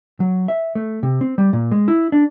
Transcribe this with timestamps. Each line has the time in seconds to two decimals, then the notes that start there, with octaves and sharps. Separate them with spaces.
0.20 F#3
0.48 E5
0.75 A3
1.03 C3
1.21 C4
1.38 G3
1.53 A#2
1.71 G#3
1.88 E4
2.12 D4